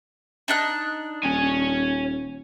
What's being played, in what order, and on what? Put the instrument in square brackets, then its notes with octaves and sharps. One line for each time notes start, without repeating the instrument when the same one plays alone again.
[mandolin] D4 D#4 F#6
[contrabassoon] D#1 [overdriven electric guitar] C#5 G#5